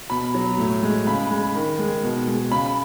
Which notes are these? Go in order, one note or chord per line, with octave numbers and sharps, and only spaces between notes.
B2 B5
F#3
A2
G#3
C#3 B5
G#3
D#3
G#3
B2
G#3
C#3 B5